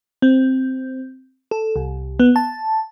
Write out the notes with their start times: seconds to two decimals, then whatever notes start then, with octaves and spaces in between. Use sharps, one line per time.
0.22 C4
1.51 A4
1.76 C2
2.20 B3
2.36 A5